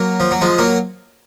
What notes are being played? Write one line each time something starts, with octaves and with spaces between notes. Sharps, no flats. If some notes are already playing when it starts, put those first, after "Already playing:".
Already playing: F#3 A#3
F3
F#3
F3 G#3
F#3 A#3